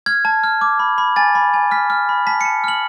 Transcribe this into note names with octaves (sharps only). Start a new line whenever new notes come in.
F6 G#6
A5
F6
D6
B5
B5
G#5 A6
B5
G#5
F6 B6
F6
B5
A5 B6
A5 C#7
F6 F#7